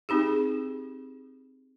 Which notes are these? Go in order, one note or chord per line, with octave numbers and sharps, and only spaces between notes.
C4 D#4 G4 G#4